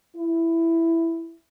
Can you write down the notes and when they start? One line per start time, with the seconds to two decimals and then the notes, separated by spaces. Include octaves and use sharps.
0.16 E4